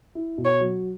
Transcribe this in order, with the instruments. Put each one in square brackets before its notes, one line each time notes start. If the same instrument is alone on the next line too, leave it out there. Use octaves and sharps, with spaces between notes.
[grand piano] E4
B2
[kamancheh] C#5
[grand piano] F#3